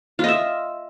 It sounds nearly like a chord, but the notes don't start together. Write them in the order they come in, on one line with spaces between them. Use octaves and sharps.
F4 D#5 E5